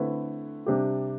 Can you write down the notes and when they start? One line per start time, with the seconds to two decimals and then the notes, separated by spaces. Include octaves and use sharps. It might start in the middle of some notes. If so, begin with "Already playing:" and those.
Already playing: D3 A3 C4 E4 B4
0.66 C3 G3 D4 G4